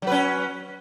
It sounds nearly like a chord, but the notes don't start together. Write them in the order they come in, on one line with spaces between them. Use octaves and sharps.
F#3 B4 C#4